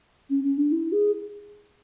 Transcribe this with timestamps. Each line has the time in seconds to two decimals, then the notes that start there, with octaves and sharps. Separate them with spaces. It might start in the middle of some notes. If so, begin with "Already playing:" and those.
0.30 C#4
0.44 C#4
0.58 D4
0.72 E4
0.92 G#4